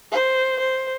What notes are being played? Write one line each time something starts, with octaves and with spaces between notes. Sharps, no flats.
C5
C5